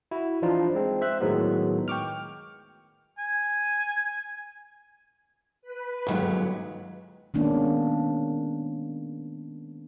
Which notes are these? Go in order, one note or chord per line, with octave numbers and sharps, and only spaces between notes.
E4 F#4
E3 F3 D4 D#4 F4
G#3 C4
C5 E5 F#6
A2 D#3 F#3 G#3 B3
G5 C#6 D6 F6
G#5
B4
G1 D#2 G#2 F#3 G#3
D#3 G#3 A#3 B3 C#4 D4